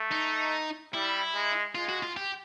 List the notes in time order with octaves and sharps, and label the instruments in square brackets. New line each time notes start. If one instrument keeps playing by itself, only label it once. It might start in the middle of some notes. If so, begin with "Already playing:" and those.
Already playing: [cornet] A3
[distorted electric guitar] D#4
[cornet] G3 [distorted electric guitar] E4
[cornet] G#3
[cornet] G#3 [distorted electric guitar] F4
[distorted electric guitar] F#4
F4
G4